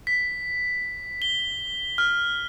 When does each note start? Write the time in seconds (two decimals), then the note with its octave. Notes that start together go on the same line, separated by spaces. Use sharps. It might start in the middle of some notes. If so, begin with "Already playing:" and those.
0.07 B6
1.22 G7
1.98 F6